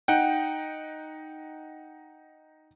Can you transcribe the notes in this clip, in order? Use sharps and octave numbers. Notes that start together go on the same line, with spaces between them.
D#4 F#5 G5